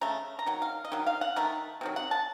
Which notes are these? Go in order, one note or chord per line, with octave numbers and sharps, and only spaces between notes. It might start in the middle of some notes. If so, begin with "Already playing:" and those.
C#3 A3 A#5
A#5
D#3 F#3
F5
D#5
D#3 F#3
F5
F#5
D#3 A3 A#5
C3 D#3 F#3
F#5
A5